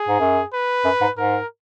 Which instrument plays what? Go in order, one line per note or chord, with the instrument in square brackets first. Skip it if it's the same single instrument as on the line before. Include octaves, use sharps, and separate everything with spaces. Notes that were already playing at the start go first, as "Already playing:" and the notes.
Already playing: [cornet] G#4
[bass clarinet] G#2
F#2
[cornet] B4
[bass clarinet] F#2
G#2
[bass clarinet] G#2 [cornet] A#4